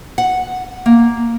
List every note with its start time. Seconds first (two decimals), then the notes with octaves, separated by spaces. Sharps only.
0.18 F#5
0.86 A#3